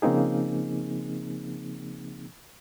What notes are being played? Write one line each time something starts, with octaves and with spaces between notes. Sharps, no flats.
C#3 F3 A#3 C4 D#4 G#4